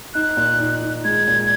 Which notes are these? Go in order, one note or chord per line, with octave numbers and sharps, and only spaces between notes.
D#4 F#6
A#2
D#4
D#4
G#3 G#6
A#2